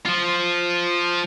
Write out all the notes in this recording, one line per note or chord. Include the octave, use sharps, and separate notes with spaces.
F3 F4